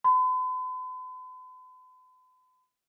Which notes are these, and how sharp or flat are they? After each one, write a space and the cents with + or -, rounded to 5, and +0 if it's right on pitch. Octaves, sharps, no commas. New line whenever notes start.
B5 +45